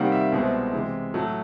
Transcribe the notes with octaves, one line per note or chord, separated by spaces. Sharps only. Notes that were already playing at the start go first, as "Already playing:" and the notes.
Already playing: C3 D#3 G3 A#3 F#5
E5
C2 B2 G#3 C4
C3 E3 G#3
A2 F#3 A3